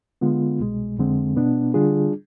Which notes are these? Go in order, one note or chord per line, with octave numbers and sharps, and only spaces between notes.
D3 G#3 B3 F4
C2 B2 G#3
F2 D3 G#3 C4
B2 B3 D4
D3 G3 D4 F4 G#4